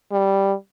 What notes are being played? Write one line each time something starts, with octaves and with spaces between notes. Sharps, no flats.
G3